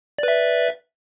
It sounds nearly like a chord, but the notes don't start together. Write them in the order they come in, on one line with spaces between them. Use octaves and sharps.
D5 B4 E5